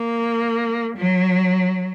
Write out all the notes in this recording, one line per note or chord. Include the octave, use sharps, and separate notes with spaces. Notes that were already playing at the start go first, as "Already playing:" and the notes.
Already playing: A#3
F#3